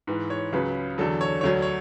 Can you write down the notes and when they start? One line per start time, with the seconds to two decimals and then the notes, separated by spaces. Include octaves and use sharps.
0.07 G#2 E3 B4
0.30 C#5
0.53 C#2 C#3 F#3 B4
0.98 E2 D3 F#3 A4
1.21 C#5
1.41 D2 D3 F#3 C#5
1.62 C#5